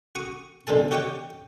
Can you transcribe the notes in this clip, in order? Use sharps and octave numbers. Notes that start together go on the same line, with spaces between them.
F#4 C#6 D#6
B1 D3 G#3 G#4 A5
F#4 G4 C#5 D#5 F#5 G5